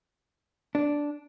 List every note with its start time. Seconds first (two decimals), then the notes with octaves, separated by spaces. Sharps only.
0.75 D4